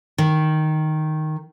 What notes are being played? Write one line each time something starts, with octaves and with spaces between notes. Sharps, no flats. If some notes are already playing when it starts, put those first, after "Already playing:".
D#3